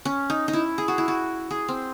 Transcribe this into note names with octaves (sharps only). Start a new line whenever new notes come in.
C#4
D#4
D#4
E4
G#4
F#4
E4
F#4
G#4
C4